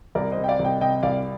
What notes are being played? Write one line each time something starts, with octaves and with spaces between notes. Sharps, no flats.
C2 A#4 D5
C5 D#5
C3
G5
D5 F5
C2
D#5 G5
C3 D#5 G5
C2 D5 F5